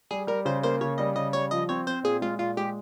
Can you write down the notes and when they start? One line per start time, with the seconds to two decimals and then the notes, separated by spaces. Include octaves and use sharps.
0.11 G3 G#4
0.27 G3 A#4
0.45 C#3 C5
0.63 A#3 C5
0.81 C#3 C#5
0.98 G3 D#5
1.16 C#3 D#5
1.33 G3 C#5
1.51 F3 D#5
1.69 C4 C#5
1.87 C4 C5
2.03 A#2 G#4
2.22 G#3 F4
2.39 A#2 F4
2.57 G#3 G4